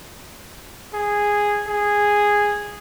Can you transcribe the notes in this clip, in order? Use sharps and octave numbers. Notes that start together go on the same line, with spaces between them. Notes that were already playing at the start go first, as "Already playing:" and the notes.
G#4
G#4